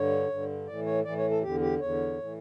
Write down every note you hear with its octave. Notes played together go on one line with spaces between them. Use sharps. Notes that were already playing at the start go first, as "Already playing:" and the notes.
Already playing: G2 D3 C#5
G2 D3
A2 E3 D5
C#5
A2 E3 D5
C#5
A4
E2 D3 G4
G4
E2 D3 C#5
A2 E3